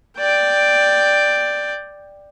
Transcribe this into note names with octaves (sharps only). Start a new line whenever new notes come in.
D5 G5